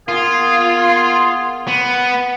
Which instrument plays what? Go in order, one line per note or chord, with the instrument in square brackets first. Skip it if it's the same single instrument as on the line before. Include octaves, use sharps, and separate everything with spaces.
[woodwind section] A#3 B3 G#4 [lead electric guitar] F4
[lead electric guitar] B3